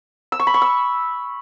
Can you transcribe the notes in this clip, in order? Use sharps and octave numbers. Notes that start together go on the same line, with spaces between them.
E6
C#6
B5
C#6
E6